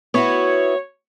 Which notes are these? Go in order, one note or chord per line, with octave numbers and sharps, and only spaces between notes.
B3 E4 F#4 C#5